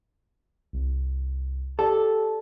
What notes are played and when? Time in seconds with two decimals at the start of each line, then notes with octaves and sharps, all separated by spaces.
0.73 C2
1.79 G4 A4 D5